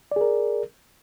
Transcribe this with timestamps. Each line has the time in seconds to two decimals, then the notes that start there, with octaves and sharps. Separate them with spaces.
0.12 D5
0.16 G#4
0.21 A#4